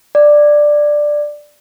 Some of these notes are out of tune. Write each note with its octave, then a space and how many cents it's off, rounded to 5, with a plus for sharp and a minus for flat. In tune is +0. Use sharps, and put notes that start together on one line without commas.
D5 +10